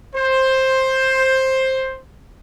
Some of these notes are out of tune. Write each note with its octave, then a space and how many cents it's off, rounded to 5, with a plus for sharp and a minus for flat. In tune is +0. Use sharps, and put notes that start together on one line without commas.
C5 +10